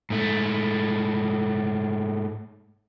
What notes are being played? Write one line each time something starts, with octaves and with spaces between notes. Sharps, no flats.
G#2 A3